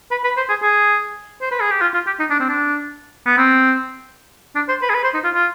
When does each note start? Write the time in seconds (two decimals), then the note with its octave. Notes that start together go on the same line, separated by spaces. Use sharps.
0.11 B4
0.24 B4
0.37 C5
0.49 G#4
0.63 G#4
1.41 C5
1.51 B4
1.61 G#4
1.71 G4
1.81 F4
1.94 F4
2.07 G4
2.20 D#4
2.30 D4
2.40 C4
2.49 D4
3.26 B3
3.38 C4
4.56 D4
4.69 C5
4.82 B4
4.90 G#4
4.95 B4
5.04 C5
5.14 D#4
5.24 F4
5.34 F4